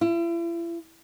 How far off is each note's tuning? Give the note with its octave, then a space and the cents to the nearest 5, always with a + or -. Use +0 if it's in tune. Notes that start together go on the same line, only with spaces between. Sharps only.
E4 +40